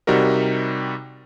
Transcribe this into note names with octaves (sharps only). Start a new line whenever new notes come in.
C3 G3 D#4 F#4 A#4